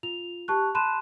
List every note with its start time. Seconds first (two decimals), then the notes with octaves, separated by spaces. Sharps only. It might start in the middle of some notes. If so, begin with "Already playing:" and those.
0.03 F4 F7
0.48 G4 A5 C#6 F#6
0.75 A5 B5 C6 F#6 D#7 E7